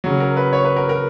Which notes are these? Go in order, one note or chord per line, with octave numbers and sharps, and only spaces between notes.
C#3 F#3
A#4
B4
C#5
B4
A#4
A#4